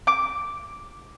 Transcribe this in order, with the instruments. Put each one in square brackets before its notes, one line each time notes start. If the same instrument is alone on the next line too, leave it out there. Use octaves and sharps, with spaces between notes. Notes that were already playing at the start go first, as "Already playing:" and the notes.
[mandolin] D6